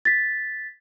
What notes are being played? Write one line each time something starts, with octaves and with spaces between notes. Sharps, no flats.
A6 B6